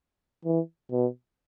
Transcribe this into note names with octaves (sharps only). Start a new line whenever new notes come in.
E3
B2